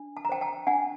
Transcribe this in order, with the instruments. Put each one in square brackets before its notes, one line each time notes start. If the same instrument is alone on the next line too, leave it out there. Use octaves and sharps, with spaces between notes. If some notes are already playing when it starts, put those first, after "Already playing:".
Already playing: [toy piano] D4
A5
A#5
C5 G5 A5
G5 A5
D4 F#5 G#5